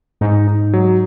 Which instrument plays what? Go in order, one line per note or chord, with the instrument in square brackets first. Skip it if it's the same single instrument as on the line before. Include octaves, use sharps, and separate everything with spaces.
[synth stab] G#2 [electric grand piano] D#4
[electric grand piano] D#4
F#3